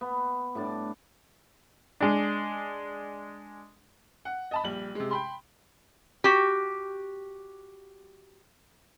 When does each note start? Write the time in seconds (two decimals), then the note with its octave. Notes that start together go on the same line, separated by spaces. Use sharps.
0.01 B3
0.55 A2 G3 D4 D5
2.00 G#3 D4
4.25 F#5
4.51 D#5 A5 B5
4.64 A#1 G3 F#7
4.95 C3 G#3
5.11 G5 B5 C6
6.24 F#4 G4